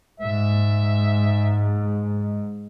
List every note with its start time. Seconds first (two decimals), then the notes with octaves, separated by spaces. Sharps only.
0.20 G#2 E5